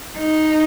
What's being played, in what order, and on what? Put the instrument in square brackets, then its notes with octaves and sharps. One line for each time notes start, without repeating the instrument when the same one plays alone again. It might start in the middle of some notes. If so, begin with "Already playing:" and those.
[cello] D#4